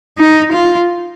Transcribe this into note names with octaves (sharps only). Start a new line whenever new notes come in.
D#4
F4